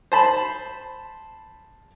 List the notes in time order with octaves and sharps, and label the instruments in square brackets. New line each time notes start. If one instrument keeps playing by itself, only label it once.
[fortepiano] C5 A5 B5